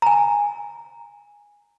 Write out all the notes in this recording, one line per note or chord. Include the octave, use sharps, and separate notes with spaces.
G#5 A#5